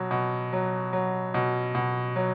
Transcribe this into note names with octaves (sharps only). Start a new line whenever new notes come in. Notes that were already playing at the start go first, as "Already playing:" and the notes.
Already playing: B2 F#3
B2
F#3
F#3
B2
B2
F#3